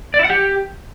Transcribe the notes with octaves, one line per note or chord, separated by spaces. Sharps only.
D5
E4
F#5
G4